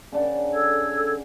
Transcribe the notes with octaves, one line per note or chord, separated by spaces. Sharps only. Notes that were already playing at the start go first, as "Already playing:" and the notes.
C#3 D4 D5 F#5
A4 E6 G#6